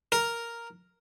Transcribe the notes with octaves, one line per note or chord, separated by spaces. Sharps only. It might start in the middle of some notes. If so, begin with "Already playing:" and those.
A#4